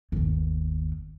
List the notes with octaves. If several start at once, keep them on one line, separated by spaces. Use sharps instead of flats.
G1 D#2